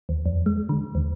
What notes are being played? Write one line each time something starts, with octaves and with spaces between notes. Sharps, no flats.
D#2
F2
G#3
D3
D#2